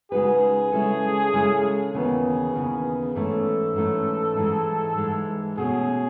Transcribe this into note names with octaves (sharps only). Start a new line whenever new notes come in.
C#3 G#3 D#4 F#4 G#4 B4
C#3 G#3 C#4 E4 A4
C#3 G#3 C#4 E4 A4
D#2 C#3 E3 B3 G#4
D#2 C#3 E3 B3
G#2 E3 A3 C#4 A4
G#2 E3 A3 C#4
G#2 E3 G#3
G#2 E3 G#3
B2 A3 C#4 G#4